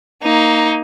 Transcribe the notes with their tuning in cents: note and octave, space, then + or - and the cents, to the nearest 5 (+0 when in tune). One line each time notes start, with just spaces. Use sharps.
A#3 +0 D#4 +10